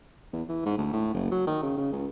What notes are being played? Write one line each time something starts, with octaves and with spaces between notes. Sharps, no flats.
E2
E3
G#2
D2
A2
F#1
F#3
D#3
C#3
C#3
C#2